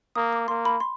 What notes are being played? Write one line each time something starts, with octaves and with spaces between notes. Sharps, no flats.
A#3 D#6
D6
A#3 C6
B5
C6